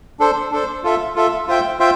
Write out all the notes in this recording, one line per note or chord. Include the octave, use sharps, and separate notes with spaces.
D4 A4 C5
D4 A4 C5
F4 A4 E5
F4 A4 E5
F4 C5 E5 G5
F4 C5 E5 G5